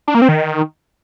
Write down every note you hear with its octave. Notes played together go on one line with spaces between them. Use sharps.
D4
A#3
C4
D#3